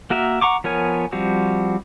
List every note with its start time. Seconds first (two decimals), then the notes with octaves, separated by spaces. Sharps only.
0.10 A#3 F#4 A#4 E5
0.41 F#5 A#5 C#6 D6
0.64 F3 B3 A#4 C#5 G#5
1.12 F3 G3 C4 F#4